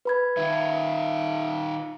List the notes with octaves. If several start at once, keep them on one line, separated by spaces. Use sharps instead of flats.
B4 B5 G#6
D#3 F4 E5